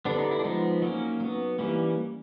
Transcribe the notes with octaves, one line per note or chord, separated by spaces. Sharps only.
D3 G3 B3 D4
D#4
E4
D4
F3 G#3 B3 D#4
F#3 A#3 C#4
F#3 B3
E3 G3 A#3 C#4